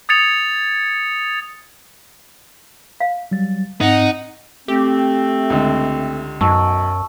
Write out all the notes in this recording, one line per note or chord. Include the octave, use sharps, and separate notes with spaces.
D#6 G#6 A6 C#7 F7
F5
F#3 G3 A6
G#2 C4 D#4 D#5 F#5
A3 C4 G4
C#2 D3
B1 F#2 A5 C#6 E6